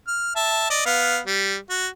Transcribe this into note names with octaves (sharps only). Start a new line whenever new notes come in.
F6
E5 A5
D5 D#5
B3 F5
G3
F#4